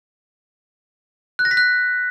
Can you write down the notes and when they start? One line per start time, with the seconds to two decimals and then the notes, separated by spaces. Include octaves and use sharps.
1.39 F#6
1.45 A#6
1.51 B6
1.57 F#6